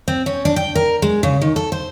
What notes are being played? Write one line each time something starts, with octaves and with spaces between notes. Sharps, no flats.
C4
C#4
D4
G5
A#4
G#3
C#3
D#3
A4
C5